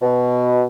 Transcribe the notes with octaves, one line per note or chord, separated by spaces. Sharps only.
B2